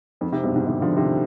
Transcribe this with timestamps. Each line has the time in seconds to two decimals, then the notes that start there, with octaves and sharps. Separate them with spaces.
0.21 F2 G#2
0.32 G#2 C3
0.43 G2 B2
0.56 G#2 C3
0.67 C3 D#3
0.82 D3 F3
0.97 C3 D#3